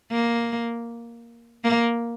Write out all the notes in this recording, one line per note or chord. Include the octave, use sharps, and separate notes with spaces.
A#3
A#3